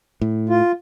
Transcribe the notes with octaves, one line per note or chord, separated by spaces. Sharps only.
A2
F4